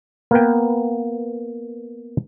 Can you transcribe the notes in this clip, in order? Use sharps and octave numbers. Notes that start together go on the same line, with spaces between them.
A#3 B3 B4 G5